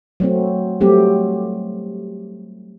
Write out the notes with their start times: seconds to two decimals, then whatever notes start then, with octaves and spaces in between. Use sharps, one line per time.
0.20 F#3 A3 C4
0.81 F#3 G3 A3 C4 G4